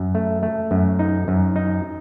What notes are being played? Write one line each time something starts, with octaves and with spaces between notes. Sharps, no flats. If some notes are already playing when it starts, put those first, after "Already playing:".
Already playing: F#2
A3
A3
F#2
D#4
F#2
D#4